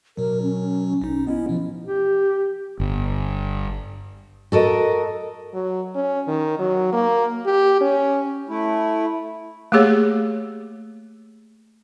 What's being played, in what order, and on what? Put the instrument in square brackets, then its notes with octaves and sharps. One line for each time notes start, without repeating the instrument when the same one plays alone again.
[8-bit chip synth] B2 F#3 [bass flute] A#4
[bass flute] C#4
[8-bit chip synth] A#1 D#4
[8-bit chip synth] B3 C#4 E4 [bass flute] D#5
[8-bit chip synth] B2 [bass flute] F3
[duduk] G4
[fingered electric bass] G1
[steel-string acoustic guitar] F#4 A4 A#4 D#5
[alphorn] F#3
C#4
D#3
F#3
A#3
G4
C#4
[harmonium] A3 E4
[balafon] A3 A#3 G4 G#4 C#5